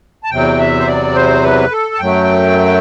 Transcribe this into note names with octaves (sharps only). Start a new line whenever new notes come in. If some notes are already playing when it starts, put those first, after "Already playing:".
A5
E2 C3 F#3 G5
E5
C5
D5
C5
B4
A4
A5
F#2 F#3 A3 G5